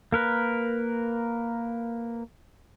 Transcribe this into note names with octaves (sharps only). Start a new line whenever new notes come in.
A#3 A#4 B4